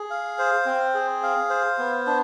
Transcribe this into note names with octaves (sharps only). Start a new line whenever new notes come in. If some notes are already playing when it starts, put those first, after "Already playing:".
Already playing: G#4
F5
C5
C4
G#4
F5
C5
B3
D4